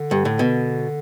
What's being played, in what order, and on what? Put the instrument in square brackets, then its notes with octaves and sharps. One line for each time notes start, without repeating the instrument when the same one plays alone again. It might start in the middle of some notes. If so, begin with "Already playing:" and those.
Already playing: [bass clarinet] D3
[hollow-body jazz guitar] G2
A2
B2